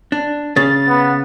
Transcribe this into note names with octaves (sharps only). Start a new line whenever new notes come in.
D4
C#3 A6
B3